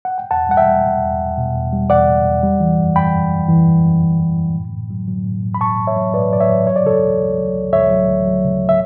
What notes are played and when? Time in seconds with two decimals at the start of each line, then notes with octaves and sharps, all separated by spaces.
0.05 F#5
0.18 G5
0.31 E2 F#5 A5
0.49 G3 F#5
0.57 E5 G5
0.66 G3
0.84 B2
1.02 E2
1.19 E2
1.37 B2
1.55 E2
1.73 G3
1.90 E2 D5 F#5
2.07 E2
2.25 E2
2.43 G3
2.60 E3
2.79 F#2
2.96 F#2 G5 B5
3.14 F#2
3.31 F#2
3.49 E3
3.66 F#2
3.84 F#2
4.02 F#2
4.19 E3
4.37 F#2
4.55 A2
4.73 A2
4.90 F#3
5.08 F#3
5.25 A2
5.43 A2
5.54 B5
5.61 A2 A5 C#6
5.79 A2
5.87 C#5 E5
5.96 F#3
6.14 A2 B4 D5
6.32 F#3 D5
6.40 C#5 E5
6.49 F#3
6.67 F#3 C#5
6.76 D5
6.84 C#3 A4 C#5
7.02 D2
7.19 D2
7.38 F#3
7.55 D2
7.73 D2 C#5 E5
7.90 F#3
8.08 D2
8.26 F#3
8.44 C#3
8.69 E5